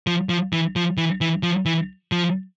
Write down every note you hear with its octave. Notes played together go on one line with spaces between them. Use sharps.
F3
F3
E3
F3
E3
E3
F3
E3
F3